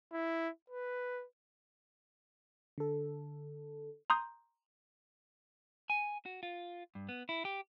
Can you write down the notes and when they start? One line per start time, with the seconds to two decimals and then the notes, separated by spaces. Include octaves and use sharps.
0.13 E4
0.70 B4
2.78 D3 A4
4.10 A#5 C6 D#6 G6
5.90 G#5
6.26 F#4
6.43 F4
6.95 G2
7.09 B3
7.29 E4
7.45 G4